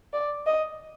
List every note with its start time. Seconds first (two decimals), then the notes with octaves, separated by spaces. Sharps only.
0.13 D5
0.46 D#5